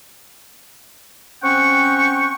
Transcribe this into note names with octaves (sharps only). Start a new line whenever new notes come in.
C4 C#4 F#5 G5 C#6